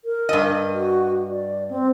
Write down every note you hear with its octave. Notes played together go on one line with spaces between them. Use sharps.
A#4
G2 D#5
F#4
D5
C4